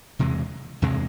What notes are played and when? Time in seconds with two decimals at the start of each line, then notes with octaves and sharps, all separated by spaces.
0.19 E2 C3 E3 G#3
0.82 E2 C3 E3 G#3